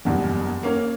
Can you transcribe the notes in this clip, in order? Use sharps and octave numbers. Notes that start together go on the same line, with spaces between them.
F#1 E2 G2
A#3 C#4 A#4